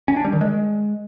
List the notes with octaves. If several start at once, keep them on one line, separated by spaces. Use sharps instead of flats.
C#4
D4
G3
D#3
G#3